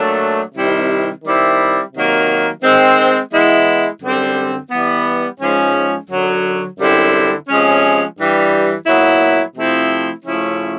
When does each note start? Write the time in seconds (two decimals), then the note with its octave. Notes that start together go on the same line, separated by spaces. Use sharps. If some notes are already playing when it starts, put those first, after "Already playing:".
Already playing: A#2 F#3 A3 D4
0.55 C3 D#3 G3 C4 E4
1.23 D#3 G3 C4 E4
1.93 C3 D#3 F#3 A#3
2.62 D#3 G#3 C4
3.32 E3 G#3 B3 E4
4.01 F#2 D3 G3 C4
4.70 E3 G3 B3
5.39 G#2 F3 G#3 C#4
6.09 F#2 D3 F#3
6.78 F#2 D3 G3 C4 E4
7.47 C3 F3 G#3 C#4
8.17 G2 E3 G3
8.86 A#2 F#3 B3 E4
9.56 C3 F3 A3 C4 E4
10.24 C#3 F3 A3 C#4 E4